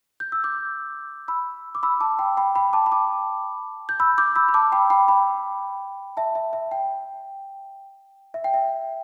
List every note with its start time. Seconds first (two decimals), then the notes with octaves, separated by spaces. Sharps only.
0.20 G6
0.32 E6
0.44 D6 G6
1.28 B5 E6
1.75 D6
1.83 B5 E6
2.00 A5 D6
2.19 G5 B5
2.37 G5 B5
2.55 G5 B5
2.73 A5 D6
2.86 B5
2.92 A5 D6
3.89 G6
4.00 B5 E6
4.18 D6 G6
4.36 B5 E6
4.48 B5
4.54 A5 D6
4.72 G5 B5
4.90 G5 B5
5.08 G5 B5
6.17 E5 A5
6.35 E5
6.53 E5
6.71 G5
8.34 E5
8.44 G5
8.54 E5